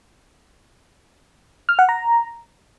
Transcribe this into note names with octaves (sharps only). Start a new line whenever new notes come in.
F6
F#5
A#5